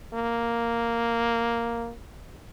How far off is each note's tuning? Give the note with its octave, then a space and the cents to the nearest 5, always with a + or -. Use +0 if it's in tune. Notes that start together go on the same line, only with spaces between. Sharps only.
A#3 +0